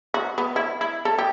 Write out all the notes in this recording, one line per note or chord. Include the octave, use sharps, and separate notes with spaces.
F#4
B3
E4
E4
A4
G4